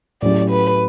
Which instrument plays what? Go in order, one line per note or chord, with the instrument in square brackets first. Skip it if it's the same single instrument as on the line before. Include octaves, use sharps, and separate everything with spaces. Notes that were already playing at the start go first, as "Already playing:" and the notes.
[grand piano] A2 F#3 C#4 G4 [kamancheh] D5
[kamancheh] B4